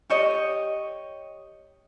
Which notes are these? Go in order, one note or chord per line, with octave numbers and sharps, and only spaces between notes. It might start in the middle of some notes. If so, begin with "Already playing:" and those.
G4 C#5 D#5